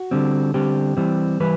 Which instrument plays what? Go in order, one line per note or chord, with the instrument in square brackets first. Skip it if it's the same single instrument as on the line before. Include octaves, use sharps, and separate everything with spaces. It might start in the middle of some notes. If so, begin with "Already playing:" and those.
Already playing: [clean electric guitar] F#4
D3 G3 C4
D3 G3 C4 G4
E3 G3 C4
E3 G3 B4